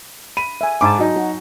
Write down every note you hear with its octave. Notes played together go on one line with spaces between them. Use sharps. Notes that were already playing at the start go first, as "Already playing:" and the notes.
B5 D#7
E5 G#5
G#2 G#5 A5 D6
F#3 D#4
F#4